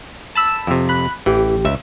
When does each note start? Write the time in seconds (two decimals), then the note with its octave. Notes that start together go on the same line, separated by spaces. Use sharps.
0.35 A5 B5 E6
0.67 F2 C3
0.89 B5 F#6
1.26 A1 E3 G4
1.65 C#2 E5